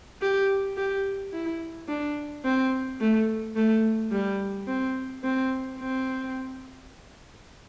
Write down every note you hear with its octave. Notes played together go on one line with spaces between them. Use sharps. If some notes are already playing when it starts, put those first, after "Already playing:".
G4
G4
E4
D4
C4
A3
A3
G3
C4
C4
C4